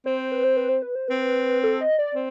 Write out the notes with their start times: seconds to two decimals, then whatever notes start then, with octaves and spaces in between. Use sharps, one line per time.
0.06 C4 C5
0.32 B4
0.44 C5
0.57 B4
0.69 C5
0.82 B4
0.95 C5
1.08 C4 B4
1.64 A4
1.81 D#5
1.99 D5
2.15 C4